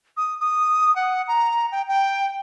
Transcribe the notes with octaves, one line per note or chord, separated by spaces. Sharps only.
D#6
D#6
F#5
A#5
G5
G5